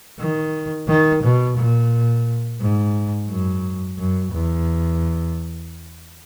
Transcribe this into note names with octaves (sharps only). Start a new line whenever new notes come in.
D#3
D#3
B2
A#2
G#2
F#2
F#2
E2